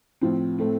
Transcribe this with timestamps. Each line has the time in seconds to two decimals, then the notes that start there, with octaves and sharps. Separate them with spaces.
0.21 A2 F3 C4
0.59 A2 A3 C4